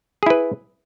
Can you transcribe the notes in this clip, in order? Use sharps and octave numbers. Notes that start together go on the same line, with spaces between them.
E4 G#4 B4